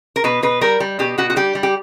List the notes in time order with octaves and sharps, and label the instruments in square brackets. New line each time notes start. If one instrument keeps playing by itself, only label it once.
[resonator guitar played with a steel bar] A#4
B2 B4
B2 B4
G3 A#4
G3
B2 G4
B2 F#4
F#4
G3 G4
G3
G4